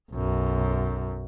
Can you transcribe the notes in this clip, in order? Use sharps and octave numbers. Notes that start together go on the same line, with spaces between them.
B1 F#2